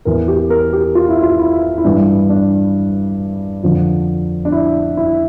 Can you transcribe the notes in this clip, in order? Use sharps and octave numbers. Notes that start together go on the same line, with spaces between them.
E2 E3 A#4
G4
A#4
G4
F4
E4
F4
E4
E4
G2 E3 D4
D4
F2 D3 F3
D4
E4
E4